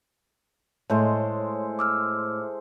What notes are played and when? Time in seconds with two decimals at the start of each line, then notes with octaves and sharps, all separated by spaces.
0.90 A2 G#3 A4 C5 C#5
1.79 D6 E6 F6